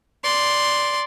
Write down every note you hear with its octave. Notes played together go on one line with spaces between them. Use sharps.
D5 C6